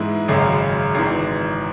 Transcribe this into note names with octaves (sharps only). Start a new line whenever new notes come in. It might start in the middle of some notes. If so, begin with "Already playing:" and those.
Already playing: G#2 E3 G#3 B3 E4
G#1 F#2 C#3 G#3
G#1 G#2 E3